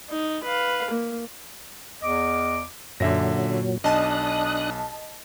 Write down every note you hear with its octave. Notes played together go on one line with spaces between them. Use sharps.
D#4
B4 F5
A#3
E2 D#5 D6
F#2 A#2 D3 F#3 E5 A#6
B1 D4 D#5 A5 D#6 F#6